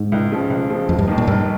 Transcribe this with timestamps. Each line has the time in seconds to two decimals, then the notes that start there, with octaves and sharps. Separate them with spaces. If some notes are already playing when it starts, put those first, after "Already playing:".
Already playing: G#2
0.12 C#2
0.32 C#3 F3
0.50 C#2
0.70 C#3 F3
0.88 F1 F2
0.99 G2
1.08 D#2 D#3
1.18 A#2
1.27 F1 G2